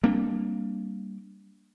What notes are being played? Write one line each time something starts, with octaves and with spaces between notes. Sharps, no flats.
G3 A#3 C4 D4